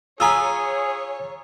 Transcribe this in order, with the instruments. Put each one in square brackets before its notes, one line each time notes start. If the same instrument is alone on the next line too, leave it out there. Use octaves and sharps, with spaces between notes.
[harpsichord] F4 G#5 B5 [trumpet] G#4 [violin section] C#5 [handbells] A#5 D#6 E6